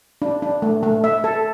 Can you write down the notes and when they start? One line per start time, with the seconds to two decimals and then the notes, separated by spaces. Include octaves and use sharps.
0.22 D4
0.42 D4
0.62 A3
0.83 A3
1.04 E5
1.24 A4